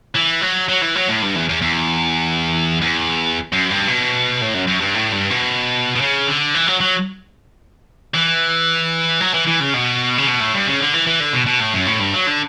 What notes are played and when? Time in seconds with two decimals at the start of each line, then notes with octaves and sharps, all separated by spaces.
0.16 E3
0.42 F#3
0.69 F#3
0.82 E3
0.96 F#3
1.08 A2
1.22 G2
1.35 E2
1.49 E2
1.62 E2
2.81 E2
3.52 F#2
3.70 G2
3.88 B2
4.41 A2
4.55 F#2
4.68 F#2
4.81 G2
4.94 A2
5.12 G2
5.30 B2
5.96 B2
6.01 C#3
6.27 D3
6.54 E3
6.68 F#3
6.80 F#3
8.14 E3
9.20 F#3
9.34 E3
9.47 E3
9.60 C#3
9.73 B2
10.18 C#3
10.27 B2
10.40 A2
10.53 G2
10.67 C#3
10.80 D3
10.94 E3
11.07 E3
11.20 D3
11.33 B2
11.47 B2
11.60 A2
11.73 F#2
11.87 A2
12.00 G2
12.13 F#3
12.27 D3